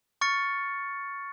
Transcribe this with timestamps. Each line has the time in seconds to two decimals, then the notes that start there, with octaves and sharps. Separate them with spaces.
0.21 C#6 F6 A6 C#7